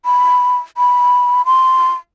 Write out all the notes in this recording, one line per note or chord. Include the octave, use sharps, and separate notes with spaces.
B5
B5
C6